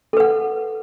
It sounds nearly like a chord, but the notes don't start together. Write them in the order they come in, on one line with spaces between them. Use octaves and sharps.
A4 B4 F#5